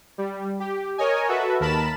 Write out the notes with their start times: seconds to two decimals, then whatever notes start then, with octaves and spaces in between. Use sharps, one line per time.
0.18 G3
0.60 G4
0.98 A#4 C#5 D#5 G#5
1.29 F#4 A4 B4 E5
1.60 D#2 A#4 A5 B5 E7